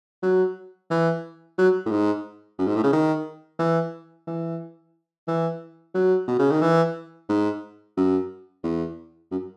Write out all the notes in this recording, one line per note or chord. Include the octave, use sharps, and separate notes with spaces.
F#3
E3
F#3
A2
G#2
F#2
G#2
A2
C#3
D#3
E3
E3
E3
F#3
B2
C#3
D#3
E3
G#2
F#2
E2
F#2